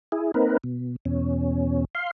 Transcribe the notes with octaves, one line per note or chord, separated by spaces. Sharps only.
E4 G#4
A#3 C4 D#4 A#4 B4
B2
E2 B2 C#4
F5 C6